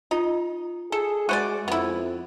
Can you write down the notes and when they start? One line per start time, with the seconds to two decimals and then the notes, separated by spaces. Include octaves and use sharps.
0.11 D#4 F4 D#5
0.92 G#4 A4
1.29 G#3 F#4 C5 D5 E5 F#6 D#7
1.68 F2 B3 E4